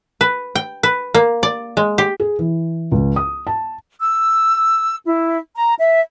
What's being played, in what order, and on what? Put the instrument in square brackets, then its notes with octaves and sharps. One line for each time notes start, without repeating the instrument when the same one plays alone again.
[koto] B4
G5
B4
A#3
D5
G#3
G4
[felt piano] G#4
E3
C#2
D#6
A5
[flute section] E6
E4
A#5
E5